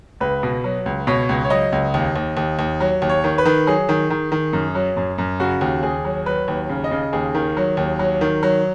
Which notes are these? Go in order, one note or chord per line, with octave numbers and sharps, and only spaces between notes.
C#2 B4
B2
F#3
C#2
B2 C#5
C#2
C#5
F#3 D#5
C#2
D#2
D#2
D#2
D#2
F#3
D#2
C#5
D#3
B4
D#3
F#3 G#4
D#3
D#3
D#3
F#2
F#3
F#2
F#2
C#3 F#4
D#2
D#2 G#4
F#3
F#3 B4
D#2
C#3
D#5
C#3
D#2 G#4
D#3
F#3
D#2
F#3
D#3
F#3